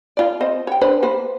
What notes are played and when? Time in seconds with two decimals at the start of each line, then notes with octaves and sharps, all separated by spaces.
0.17 F4 D5
0.41 C4 C5 D#5
0.67 C#5 G5
0.81 D4 B4 C5
1.03 A#3 B4 C5